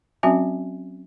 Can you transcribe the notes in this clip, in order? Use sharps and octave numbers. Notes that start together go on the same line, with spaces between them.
F#3 C4 C#4 F#4 E5 G#5